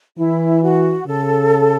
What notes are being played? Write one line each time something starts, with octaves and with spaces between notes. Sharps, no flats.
E3 E4
F#4
C#3 A4